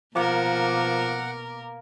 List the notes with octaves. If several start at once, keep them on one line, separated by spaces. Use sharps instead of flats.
B2 F3 A#3 A#4 F#5 D6